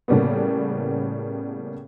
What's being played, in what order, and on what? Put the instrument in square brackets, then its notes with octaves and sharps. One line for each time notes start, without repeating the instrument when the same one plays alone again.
[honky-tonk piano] A2 C#3 G3 A#3 B3